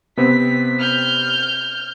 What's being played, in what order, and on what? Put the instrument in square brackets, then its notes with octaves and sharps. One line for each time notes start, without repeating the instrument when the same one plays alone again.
[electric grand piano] C3 B3 C4 [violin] B6
[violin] F6 G6